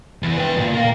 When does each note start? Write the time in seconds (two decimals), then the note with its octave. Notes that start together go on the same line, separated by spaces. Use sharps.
0.23 E2 E3
0.37 B4 G5
0.57 D2 A#2
0.74 A#4 F5